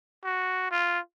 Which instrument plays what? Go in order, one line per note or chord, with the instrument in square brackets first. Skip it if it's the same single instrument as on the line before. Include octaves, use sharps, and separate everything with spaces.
[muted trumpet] F#4
F4